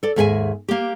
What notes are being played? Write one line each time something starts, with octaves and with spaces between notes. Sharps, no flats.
A4 D5
D#2 G#2 G#4 D#5 E5 G#5
A#3 G4